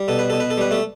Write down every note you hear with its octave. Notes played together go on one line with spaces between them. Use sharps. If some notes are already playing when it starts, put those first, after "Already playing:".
Already playing: G3
B2 A4
B4
B2 A4
B4
A4
G3 B4
A3 A4